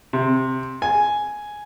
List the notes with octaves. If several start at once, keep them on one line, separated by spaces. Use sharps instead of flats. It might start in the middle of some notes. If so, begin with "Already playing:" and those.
C3
G#5